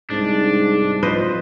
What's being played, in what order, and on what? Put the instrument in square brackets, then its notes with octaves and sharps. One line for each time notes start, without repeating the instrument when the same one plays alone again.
[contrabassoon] C2 [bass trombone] G#2 [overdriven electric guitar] D4
[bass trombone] F3 [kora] B4 C5 D#5